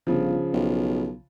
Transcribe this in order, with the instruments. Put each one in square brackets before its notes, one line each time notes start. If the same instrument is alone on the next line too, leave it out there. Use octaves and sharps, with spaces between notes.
[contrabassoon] G1 [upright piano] C#3 F3
[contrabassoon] B1